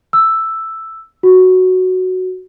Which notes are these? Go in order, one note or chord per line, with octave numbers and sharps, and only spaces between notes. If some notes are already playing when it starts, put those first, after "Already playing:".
E6
F#4